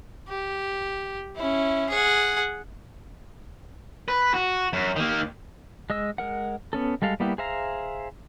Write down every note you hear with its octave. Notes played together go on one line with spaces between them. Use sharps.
G4
C#4 E4
G#4 F#5
B4
F#4
F#2
D#3 A#3
G#3 D#5 E6
G#3 A#4 F#5
B3 C#4 A4
G3 G#3 A4 F5
G3 A#3 B3 E4 G4
G#4 C5 E5 F5 A#5